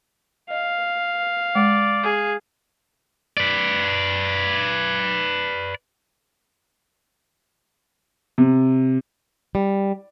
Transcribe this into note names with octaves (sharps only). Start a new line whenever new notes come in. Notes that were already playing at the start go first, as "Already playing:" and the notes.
D#5 F5
G#3 D5
G#4
B4 D5
C3
G3